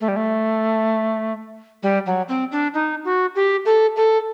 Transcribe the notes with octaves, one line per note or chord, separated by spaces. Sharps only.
A3
G3
A3
G3
F#3
C4
D4
D#4
F#4
G4
A4
A4